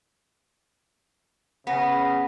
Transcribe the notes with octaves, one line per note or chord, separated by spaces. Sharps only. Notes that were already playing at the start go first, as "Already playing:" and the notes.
C#3 B3 F#5 A#6